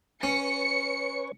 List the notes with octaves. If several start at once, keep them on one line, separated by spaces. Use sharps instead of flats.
C#4 B4 C#5 C#6 C#7